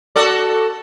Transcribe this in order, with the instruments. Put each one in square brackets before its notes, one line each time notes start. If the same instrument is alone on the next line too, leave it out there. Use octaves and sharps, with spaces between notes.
[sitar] F#4 A4 D5